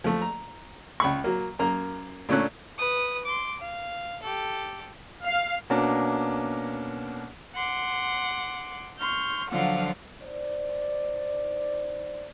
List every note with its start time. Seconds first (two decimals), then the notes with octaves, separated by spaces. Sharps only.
0.04 F3 A3
0.22 A#5
1.00 C#2 B5 C#6
1.24 F#3 A#3
1.59 F#2 A#3 A#5
2.29 A#2 D3 A3 C#4 F#6
2.78 B4 D#6
3.25 C6 D6
3.60 F5
4.22 G4 A4
5.24 F5
5.70 B2 A#3 C#4 D4
7.55 F#5 C6 D6
8.99 C6 C#6 F6 G6
9.51 D3 F3 F#3 F4 F5 F#5
10.22 D#4 C5 D5